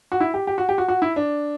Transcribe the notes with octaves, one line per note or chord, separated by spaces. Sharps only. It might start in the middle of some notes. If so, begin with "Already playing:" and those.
F#4
E4
G4
G4
F#4
G4
F#4
F#4
E4
D4